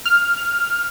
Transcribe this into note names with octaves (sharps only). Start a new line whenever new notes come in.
F6